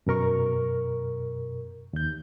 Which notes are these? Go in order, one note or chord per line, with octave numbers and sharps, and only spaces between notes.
F#2 B2 A#4 C#6
D#2 G6